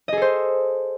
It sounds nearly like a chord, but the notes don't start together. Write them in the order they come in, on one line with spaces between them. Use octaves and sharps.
D#5 G#4 A4 C5